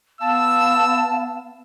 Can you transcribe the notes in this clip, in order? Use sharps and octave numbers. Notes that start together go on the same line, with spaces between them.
B3 F5 A5 E6